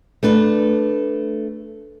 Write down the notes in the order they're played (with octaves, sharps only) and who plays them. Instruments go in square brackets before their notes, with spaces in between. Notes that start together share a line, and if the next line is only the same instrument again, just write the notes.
[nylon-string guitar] A3 D4 B4